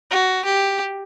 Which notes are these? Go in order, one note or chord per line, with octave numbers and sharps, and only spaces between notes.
F#4
G4